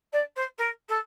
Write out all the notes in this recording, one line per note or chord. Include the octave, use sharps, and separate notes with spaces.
D5
C5
A#4
A4